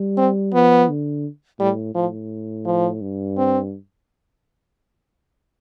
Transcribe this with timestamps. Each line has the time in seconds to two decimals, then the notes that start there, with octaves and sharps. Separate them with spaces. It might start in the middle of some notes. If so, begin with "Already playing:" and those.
Already playing: G3
0.17 C4
0.53 F3 B3
0.89 D3
1.59 A2 G3
1.95 A2 F3
2.66 F3
3.02 G2
3.37 C4